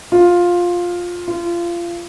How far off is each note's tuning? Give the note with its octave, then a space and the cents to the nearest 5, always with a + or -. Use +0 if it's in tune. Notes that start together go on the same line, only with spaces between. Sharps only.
F4 +10
F4 -25